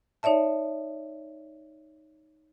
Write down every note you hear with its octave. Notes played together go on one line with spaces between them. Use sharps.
D#4 C#5 D5 E5 A5